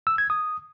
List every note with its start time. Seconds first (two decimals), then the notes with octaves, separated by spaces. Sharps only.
0.07 E6
0.18 G#6
0.30 D#6